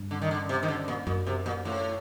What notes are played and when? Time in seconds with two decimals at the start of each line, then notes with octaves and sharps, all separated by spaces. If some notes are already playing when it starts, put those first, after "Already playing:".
Already playing: G2
0.11 D3
0.22 D#3
0.31 D3
0.49 C3
0.63 D#3
0.68 D3
0.88 A#2
1.07 F#2 A#2
1.27 C3
1.46 A#2
1.65 A2